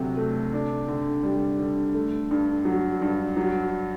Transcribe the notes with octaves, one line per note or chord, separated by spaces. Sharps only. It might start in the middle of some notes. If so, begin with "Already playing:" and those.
Already playing: D2 C3 F#3
A3
D4
D3
G3
D3
A3
G2
F#3
G2
F#3